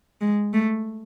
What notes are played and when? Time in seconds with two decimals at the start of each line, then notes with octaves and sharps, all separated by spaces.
0.21 G#3
0.54 A3